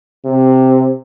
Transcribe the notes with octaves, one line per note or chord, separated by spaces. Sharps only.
C3